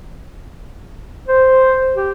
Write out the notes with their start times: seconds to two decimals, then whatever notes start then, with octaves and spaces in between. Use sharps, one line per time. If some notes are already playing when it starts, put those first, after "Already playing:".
1.28 C5
1.95 G4